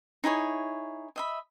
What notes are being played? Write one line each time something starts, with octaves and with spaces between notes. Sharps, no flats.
D#4 E4 G#4 C#5
D#5 E5 B5